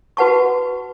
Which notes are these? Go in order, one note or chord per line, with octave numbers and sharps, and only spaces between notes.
F#4 B4 F#5 A5 C#6